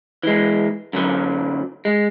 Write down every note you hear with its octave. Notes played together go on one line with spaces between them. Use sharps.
E3 G#3
F#2 D3 F#3
G#3